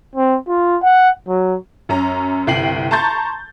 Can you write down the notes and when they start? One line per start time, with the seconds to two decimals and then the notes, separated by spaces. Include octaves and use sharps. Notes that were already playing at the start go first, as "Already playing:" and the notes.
0.16 C4
0.49 F4
0.83 F#5
1.28 F#3
1.89 F#2 C#4 A#5
2.47 G1 C2 G5 C7 F#7
2.91 A5 A#5 C6 C#6 G6 A6